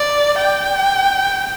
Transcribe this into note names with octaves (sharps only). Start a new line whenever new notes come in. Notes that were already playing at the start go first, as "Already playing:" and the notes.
Already playing: D5
G5